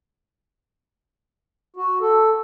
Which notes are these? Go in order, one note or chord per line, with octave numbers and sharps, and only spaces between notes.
F#4
A4